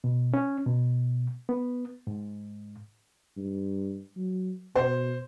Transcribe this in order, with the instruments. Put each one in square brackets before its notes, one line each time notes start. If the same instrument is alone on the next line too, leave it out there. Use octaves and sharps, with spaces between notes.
[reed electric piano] B2
C#4
B2
B3
G#2
[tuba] G2
F#3
[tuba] B2 [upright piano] C5